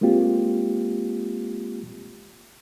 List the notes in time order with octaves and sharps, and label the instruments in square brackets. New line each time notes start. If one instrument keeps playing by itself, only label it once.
[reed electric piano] G#3 A#3 C4 F4 G4